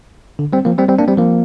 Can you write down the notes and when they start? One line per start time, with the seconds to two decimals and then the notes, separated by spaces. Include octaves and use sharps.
0.39 D3
0.53 G3 C4
0.65 F3 A#3
0.78 G3 C4
0.88 G3 C4
0.98 A#3 D4
1.08 G3 C4
1.17 F3 A#3